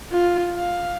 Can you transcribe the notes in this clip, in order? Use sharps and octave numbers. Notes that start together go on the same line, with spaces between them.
F4
F5